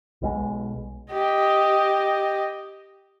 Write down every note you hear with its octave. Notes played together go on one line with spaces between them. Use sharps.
B1 B2 D3 G#3
G4 D#5